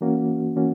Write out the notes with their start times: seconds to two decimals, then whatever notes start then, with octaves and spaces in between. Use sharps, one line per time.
0.01 E3 A#3 C#4 F#4
0.56 E3 A#3 C#4 F#4